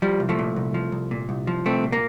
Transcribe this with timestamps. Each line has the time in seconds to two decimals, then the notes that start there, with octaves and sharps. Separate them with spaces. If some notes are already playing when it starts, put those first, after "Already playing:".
0.02 F3 G3
0.20 C2
0.29 F3 A3
0.39 A#2
0.56 C2
0.74 F3
0.92 C2
1.11 A#2
1.29 C2
1.47 F3
1.65 C2 A3 C4
1.84 A#2
1.92 A#3